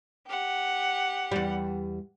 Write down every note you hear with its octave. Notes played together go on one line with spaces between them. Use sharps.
G4 F#5
E2 G3